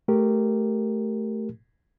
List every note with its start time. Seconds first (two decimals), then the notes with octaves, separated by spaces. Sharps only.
0.08 A3 G4 A#4